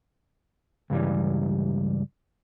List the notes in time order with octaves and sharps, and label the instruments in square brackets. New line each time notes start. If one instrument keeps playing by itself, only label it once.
[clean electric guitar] C#2 G2 E3 G3